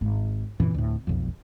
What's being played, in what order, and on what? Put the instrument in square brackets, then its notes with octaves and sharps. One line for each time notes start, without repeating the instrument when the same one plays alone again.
[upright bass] G#1
[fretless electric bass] F#2 A#2 E3 [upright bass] D3 C4
[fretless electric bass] D2 A2
E1 B1 F2